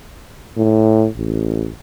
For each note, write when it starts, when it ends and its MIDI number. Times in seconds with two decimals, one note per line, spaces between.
0.57 1.07 45
1.16 1.70 33